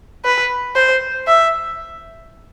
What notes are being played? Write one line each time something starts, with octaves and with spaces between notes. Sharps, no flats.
B4
C5
E5